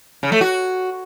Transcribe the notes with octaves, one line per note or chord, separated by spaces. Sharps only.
C#3
A3
F#4